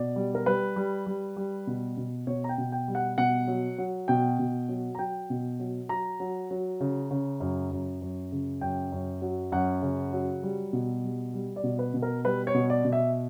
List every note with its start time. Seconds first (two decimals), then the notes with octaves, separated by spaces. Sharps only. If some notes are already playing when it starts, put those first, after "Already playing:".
Already playing: B2 D5
0.16 G3
0.35 A#4
0.46 G3 B4
0.76 G3
1.06 G3
1.37 G3
1.67 B2
1.97 B2
2.27 B2 C#5
2.44 A#5
2.49 G5
2.58 B2
2.72 G5
2.88 G3
2.95 F#5
3.18 B2 F#5
3.47 F#3
3.78 F#3
4.08 B2 G5
4.39 B2
4.69 F#3
4.95 A#5
4.99 F#3 G5
5.30 B2
5.60 F#3
5.89 F#3 A#5
6.20 F#3
6.51 F#3
6.80 C#3
7.11 C#3
7.40 F#2
7.71 F#2
8.01 F#2
8.32 C#3
8.61 F#2 G5
8.92 F#2
9.22 F#3
9.52 F#2 F#5
9.82 C#3
10.13 F#3
10.43 G3
10.73 B2
11.04 G3
11.34 G3
11.56 D5
11.64 B2
11.79 B4
11.94 B2
12.02 A#4
12.25 G3 B4
12.47 C#5
12.54 B2
12.70 D5
12.85 B2
12.93 E5